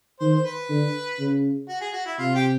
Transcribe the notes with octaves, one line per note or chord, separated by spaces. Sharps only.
D#3 C5
C5
B4
D3
C#3
F#4
G#4
F#4
E4
C3 F4
G4